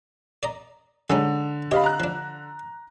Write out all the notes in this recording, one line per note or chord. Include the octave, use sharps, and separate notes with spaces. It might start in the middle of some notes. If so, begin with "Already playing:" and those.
D5 D#5 A#5
D3 G#3 C#4 D#4
G4 C#5 D#5 F5 B5
A#5 F#6
F3 D4